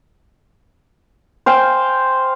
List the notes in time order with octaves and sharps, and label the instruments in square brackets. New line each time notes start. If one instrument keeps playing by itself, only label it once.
[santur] C5 F5 G5 G#5